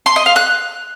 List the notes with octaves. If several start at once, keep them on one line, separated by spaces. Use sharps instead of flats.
C6
D#5
F5
F#6